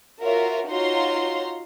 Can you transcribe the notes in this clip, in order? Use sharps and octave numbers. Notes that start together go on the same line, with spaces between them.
F4 F#4 A#4 C#5 E5
D#4 F4 F#4 C#5 A#5 C6